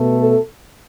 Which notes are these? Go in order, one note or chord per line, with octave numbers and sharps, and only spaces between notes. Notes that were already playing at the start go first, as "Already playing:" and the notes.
Already playing: B2 A3
A4